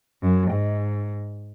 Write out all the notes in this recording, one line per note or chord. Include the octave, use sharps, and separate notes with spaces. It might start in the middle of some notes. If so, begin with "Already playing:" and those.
F#2
G#2